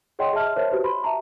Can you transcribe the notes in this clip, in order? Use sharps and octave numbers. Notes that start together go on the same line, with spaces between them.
G#4 C#5 D#5 F#5 G5 C6
G#4 D#5 E5 A5 F6
A#4 C5 C#5 E5
F#4 G4 B4 C5
B5 C6
E5 A5 A#5 C#6